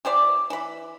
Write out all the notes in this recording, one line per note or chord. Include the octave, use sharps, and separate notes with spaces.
E3 G4 C5 D5
E3 B5